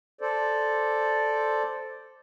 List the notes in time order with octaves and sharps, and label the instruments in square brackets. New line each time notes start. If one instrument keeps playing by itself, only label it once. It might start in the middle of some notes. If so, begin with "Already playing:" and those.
[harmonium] A4 C5 D5